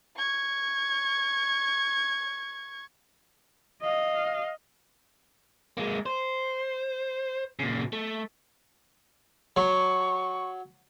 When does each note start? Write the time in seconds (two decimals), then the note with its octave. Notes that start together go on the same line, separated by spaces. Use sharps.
0.17 C#6 G#6
3.81 D#5 F5
5.77 G#3 A#3
6.06 C5
7.59 A#2 C#3
7.93 A3
9.56 F#3 C#6